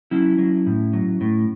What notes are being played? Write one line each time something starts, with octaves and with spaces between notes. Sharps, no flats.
F#3 C#4 E4
F#3
A2
F#3
A2